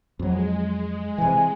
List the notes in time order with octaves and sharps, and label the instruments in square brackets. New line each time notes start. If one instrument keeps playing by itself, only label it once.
[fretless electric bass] F2 F#3 [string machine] G#3
[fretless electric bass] C3 E3 [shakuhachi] G#5